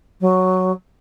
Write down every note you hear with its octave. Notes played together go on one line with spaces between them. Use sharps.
F#3